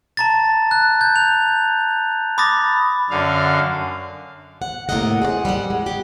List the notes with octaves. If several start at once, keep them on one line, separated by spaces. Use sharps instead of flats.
A5 A#5 A6
F#6
G6
F7
B5 D6 D#6 A6 A#6
F#2 D3 F5
F#5
A2 C3 A#3 A#4 D#5 F#5
G#4 C5 D5 F#5
G3 F#5
G#3
G4